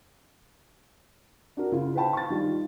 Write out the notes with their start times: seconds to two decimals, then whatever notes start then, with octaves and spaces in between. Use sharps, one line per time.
1.57 D4 F#4 A#4
1.72 C#3 E4 F4
1.95 B4 C5 F5 G5 A5 B5
2.13 C#6 A6
2.30 D#3 F3 G3 D4 F4